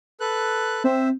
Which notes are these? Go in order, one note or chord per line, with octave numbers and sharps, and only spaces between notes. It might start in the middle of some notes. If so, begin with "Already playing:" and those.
A4 B4 F#6
C4 C5 E5